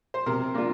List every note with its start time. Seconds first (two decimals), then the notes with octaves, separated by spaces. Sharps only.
0.14 C5
0.26 C3 A#4
0.54 A#3 D4 F4